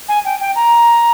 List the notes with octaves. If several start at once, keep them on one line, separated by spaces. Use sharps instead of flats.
G#5
G5
G5
A#5